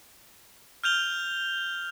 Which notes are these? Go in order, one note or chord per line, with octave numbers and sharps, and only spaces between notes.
F6 G6 F7 G7